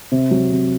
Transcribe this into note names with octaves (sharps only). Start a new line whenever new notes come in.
C3
F#3
C3